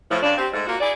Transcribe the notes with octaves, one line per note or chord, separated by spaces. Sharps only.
A2 F3
G2 C#3 D4
C4 G4
G#2 A3
A#3 F4 F#4
E4 G#4 D5